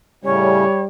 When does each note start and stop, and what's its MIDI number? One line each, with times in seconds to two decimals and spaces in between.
0.24 0.65 45
0.24 0.65 49
0.24 0.88 55
0.24 0.65 61
0.24 0.81 73